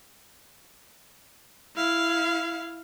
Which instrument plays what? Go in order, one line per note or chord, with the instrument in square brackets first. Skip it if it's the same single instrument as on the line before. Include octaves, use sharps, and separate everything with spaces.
[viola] E4 F5